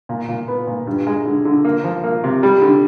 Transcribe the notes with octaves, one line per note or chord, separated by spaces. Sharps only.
A#2
A#2
B3
A#2
G2
G#3
D3
D3
A#3
F3
A#3
C3
G3
D3